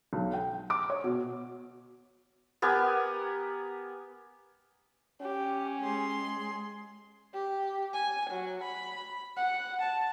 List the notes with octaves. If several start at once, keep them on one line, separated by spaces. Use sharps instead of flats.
B1
G5
D6
C#5
B2
B3 G4 A#4 G#5
C#4 G4
G#3 G#4 C6
G4
G#5
F#3
B5
F#5
A5